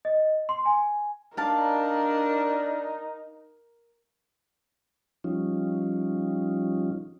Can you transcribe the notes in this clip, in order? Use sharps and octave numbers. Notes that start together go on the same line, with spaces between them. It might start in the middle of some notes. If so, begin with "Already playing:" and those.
D#5
C6
G#5
D4 D#4 A#4 F5 A5
F3 G3 C#4 D#4 F4